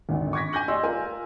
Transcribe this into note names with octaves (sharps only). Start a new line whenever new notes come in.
G#1 D2 D#3
C#6 D6 G#6 A#6 B6
G#5 D6 G6 A#6 F#7
G4 D5 D#5 C6 E6
F4 A#4 G#5